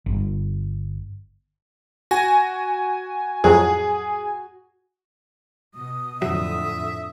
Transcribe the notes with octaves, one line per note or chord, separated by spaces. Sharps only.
G1
F#4 G#5 A#6
F2 A2 F#3 G#4
B2 D#6
F2 A2 D3 F#3 E5